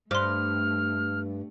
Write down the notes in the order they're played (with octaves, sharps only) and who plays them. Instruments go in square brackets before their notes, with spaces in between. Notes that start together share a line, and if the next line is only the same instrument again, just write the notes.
[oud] G2 [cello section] A3 [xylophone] C5 C6 [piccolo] F6